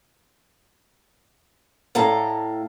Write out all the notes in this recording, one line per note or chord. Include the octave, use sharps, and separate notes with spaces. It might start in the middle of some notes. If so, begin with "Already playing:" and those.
A2 A4 F5 A#5